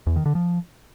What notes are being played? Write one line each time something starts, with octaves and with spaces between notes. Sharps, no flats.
E2
D#3
D3
F3